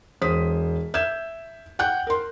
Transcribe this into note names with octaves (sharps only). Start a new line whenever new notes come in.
E1 C5 D#6 B6
E5 G6 G#6 E7
F#5 G5 F#6 G6
A#4 C6